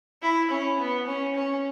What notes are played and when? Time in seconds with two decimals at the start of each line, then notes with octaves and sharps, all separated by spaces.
0.23 E4
0.50 C#4
0.79 B3
1.07 C#4
1.35 C#4